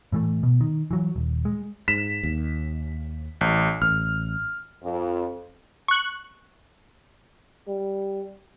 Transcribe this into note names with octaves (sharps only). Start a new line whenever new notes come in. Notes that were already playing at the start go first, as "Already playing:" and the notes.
A2 E3 F#3 A3
B2
D#3
E3 F#3
D#1
G#3
G#2 B6 E7
D#2
A1
A1 F6
F2
C#6 F#6
G3